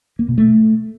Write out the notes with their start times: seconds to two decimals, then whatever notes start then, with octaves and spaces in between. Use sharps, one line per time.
0.19 A#3
0.28 B2
0.38 A3